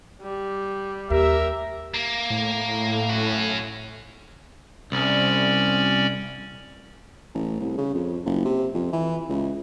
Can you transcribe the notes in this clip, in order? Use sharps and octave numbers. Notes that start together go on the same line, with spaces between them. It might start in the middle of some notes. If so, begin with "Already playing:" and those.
G3
D#2 G4 A#4 E5
A#3
A2
C#4 F#4
C2 C#4 D5
A1
C2
C#3
F2
F#1
C3
F2
E3
C#2